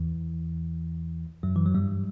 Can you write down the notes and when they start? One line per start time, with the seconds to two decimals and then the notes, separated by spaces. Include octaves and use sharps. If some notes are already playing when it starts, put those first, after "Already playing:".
Already playing: E2 E3
1.43 F#2 F#3
1.56 E3
1.66 F#3
1.74 G2 G3